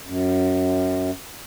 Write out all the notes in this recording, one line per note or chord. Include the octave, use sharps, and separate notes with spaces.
F#2